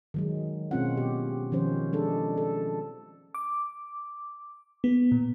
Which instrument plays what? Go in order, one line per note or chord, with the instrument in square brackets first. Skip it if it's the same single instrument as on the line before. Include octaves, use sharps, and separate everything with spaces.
[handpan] D#3 F#3 G#3
B2 G#3 C4 C#4 F4 F#5
G4
D#3 F3 C#4 C5
G#3 D4 A4
A4
[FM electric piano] D6
B3
A#2